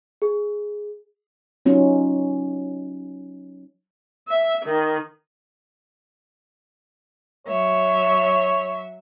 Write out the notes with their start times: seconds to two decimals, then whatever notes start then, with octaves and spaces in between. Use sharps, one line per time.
0.22 G#4
1.66 F#3 C#4 D#4 F4
4.27 E5
4.65 D#3
7.47 F#3 C#5 E5